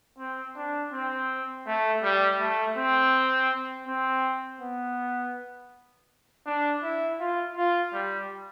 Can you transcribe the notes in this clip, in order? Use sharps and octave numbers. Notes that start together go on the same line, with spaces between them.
C4
D4
C4
A3
G3
A3
C4
C4
B3
D4
E4
F4
F4
G3